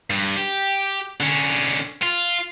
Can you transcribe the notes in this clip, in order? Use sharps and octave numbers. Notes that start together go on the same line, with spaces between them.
G2
G4
D3 C#4
F4